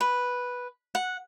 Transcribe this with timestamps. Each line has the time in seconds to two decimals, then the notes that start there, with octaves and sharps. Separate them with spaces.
0.01 B4
0.95 F#5